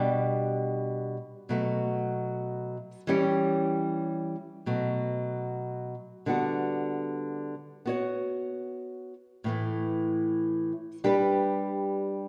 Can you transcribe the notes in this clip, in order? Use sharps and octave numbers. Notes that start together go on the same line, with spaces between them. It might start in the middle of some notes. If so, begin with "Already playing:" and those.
Already playing: B2 G3 D4 G4
B2 F#3 A3
E3 G3 C#4 G4 C#5
B2 F#3 A3
D3 G3 B3 F#4
B3 F#4 C#5
A2 E3 A3
G3 D4 G4 B4